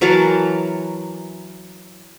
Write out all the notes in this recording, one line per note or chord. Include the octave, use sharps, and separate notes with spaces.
E3 F#3 A#4 A5